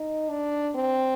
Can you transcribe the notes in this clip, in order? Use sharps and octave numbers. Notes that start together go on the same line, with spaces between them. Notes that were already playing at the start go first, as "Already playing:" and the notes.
Already playing: D#4
D4
C4